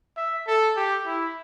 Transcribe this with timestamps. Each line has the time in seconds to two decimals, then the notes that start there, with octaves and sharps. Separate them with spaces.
0.17 E5
0.47 A4
0.76 G4
1.06 E4